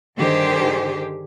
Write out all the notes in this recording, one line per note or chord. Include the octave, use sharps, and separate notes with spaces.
G2 D3 D#3 G4 G#4 C5